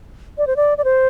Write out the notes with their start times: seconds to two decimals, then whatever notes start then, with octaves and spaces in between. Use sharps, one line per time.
0.38 D5
0.47 C5
0.56 D5
0.78 D5
0.84 C5